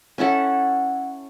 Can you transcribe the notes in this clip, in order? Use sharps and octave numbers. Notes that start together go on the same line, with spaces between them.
C#4 E4 A4 F#5